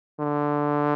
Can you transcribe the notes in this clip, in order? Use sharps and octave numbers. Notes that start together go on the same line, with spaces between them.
D3